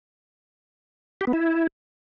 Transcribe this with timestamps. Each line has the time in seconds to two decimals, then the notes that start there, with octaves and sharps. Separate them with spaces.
1.21 G4
1.27 B3
1.33 E4